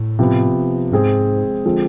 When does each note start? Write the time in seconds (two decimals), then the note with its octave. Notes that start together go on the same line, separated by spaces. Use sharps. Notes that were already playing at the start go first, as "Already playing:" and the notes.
Already playing: A2
0.19 C3 F3 B3
0.92 G#2 G#3 C4 G#4
1.65 D3 F3 G#3 C4 F4